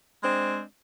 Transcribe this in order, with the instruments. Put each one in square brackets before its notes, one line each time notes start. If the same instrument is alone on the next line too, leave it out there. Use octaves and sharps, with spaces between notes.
[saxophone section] G#3 C4 D4